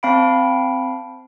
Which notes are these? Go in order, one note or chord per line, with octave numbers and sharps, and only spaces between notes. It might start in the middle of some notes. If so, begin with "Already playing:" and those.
C4 F5 G5 A5 B5 D7